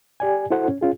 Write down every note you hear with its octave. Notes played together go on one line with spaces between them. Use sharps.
G4 D5 G#5
E4 F#4 A4 C5 F#5
C#4
C#4 F4 G#4